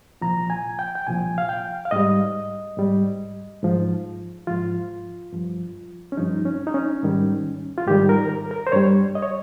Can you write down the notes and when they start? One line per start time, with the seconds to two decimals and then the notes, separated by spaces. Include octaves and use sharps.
0.21 C2 A#2 F3 A#5
0.50 G#5
0.79 G5
0.95 G5
1.07 C2 A#2 F3 G#5
1.38 F5
1.49 G5
1.85 F5
1.91 G#2 G3 D#5
2.77 G#2 G3
3.62 G#2 F3
4.47 G#2 F3 F4
5.32 G2 F3
6.12 C#4
6.17 G2 F3 D#4
6.46 C#4
6.67 D#4
6.74 C#4
7.03 G#2 D#3 G3
7.78 F4
7.87 G#2 D#3 G3 G4
8.09 A#4
8.29 A#4
8.51 A#4
8.67 C5
8.72 G2 G3 C#5
9.15 D#5
9.22 C#5